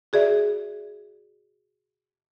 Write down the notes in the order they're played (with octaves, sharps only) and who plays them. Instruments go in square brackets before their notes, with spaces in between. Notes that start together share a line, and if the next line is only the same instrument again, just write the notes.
[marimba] F#4 G#4 D5 E5